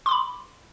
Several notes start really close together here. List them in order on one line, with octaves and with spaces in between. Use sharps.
C6 D6 B5